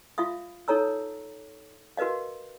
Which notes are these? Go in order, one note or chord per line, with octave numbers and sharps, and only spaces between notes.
F4 E5 F5 D#6
D#4 A4 C#5 A#5 E6
F#4 A#4 B4 D#5 F5